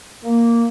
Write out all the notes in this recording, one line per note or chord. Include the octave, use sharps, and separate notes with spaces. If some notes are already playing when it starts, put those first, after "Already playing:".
A#3